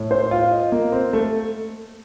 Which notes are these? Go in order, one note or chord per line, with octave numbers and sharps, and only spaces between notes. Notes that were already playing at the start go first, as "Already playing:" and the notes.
Already playing: A2
C5
F4
D#5
A#3
C4
A3